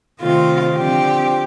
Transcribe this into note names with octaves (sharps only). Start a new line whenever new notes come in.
C3 D#3 A3 C4 F4
D3 F3 C4 G4